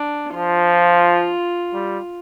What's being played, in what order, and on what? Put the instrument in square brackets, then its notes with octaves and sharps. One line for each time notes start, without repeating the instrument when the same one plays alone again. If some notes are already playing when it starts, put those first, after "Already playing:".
Already playing: [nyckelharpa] D4
[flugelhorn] F3 [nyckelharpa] F4
[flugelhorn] G3